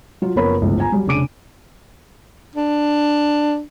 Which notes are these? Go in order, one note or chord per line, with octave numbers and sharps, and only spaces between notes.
F#3 F4
F#1 F3 B3 A#4 C#5 B5
G1 C#2 A2 F3
G#5 A#5
F#3 G3
F1 C#3 D4 D6 D7 D#7
D4